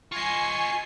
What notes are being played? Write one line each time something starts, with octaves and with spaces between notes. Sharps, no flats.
F4 D#5 G#5 C#6 C7